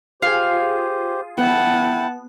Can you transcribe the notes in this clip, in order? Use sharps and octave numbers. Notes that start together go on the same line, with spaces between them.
F4 G4 G#4 C5 F5
B3 E4 F#5 G5 A5